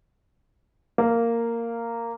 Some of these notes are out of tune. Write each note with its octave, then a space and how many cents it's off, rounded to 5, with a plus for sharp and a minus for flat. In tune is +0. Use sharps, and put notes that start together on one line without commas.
A#3 -10